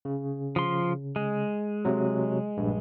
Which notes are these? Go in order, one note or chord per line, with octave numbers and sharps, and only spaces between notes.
C#3
F3 C6
G#3
C3 F#3
A#1 G2